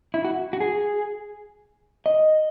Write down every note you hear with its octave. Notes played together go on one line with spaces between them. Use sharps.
E4
F#4
F#4
G#4
D#5